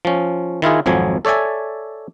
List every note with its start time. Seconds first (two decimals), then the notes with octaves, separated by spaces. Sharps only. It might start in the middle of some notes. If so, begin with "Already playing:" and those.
0.05 F3 C#4
0.62 D#3 E4 F4 G#4
0.86 G#1 F2 F3 F#3 G#5
1.25 A4 C#5 D5 E5 G#5